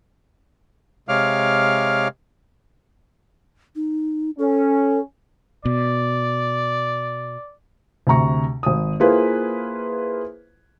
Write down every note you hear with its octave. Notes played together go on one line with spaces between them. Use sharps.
C3 G#3 C#5 F5 D6 F6
D#4
C#4 A4
B2 D5
D2 C3 A#5 C#6
G#1 D#6
A#3 E4 F4 G#4 B4 C5